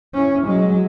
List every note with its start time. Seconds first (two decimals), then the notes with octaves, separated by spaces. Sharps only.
0.14 C#4 E4
0.46 F#3 G#3